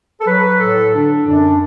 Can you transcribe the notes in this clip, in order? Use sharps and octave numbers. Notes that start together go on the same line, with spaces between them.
A4
F#3 B4
A2 A4
D3 D4
F#2 D4